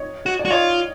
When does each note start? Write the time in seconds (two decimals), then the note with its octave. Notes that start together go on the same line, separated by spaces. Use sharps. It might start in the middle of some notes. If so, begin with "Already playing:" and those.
Already playing: C#5 D#5
0.26 F#4
0.39 D5
0.45 F#4
0.50 F4 C#5 D#5